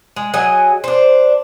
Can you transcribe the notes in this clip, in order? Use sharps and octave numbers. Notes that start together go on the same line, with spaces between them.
G#3
F#3 G#4 D#5 G#5
D4 C5